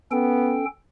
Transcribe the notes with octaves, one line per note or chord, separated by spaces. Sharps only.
B3 C#4 A4 G5